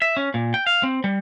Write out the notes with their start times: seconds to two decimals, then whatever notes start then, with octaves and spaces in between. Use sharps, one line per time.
0.02 E5
0.17 C#4
0.34 A#2
0.54 G5
0.67 F5
0.83 C4
1.04 G3